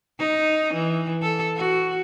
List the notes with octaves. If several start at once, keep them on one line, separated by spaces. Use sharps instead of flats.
D#4
E3
A4
F#4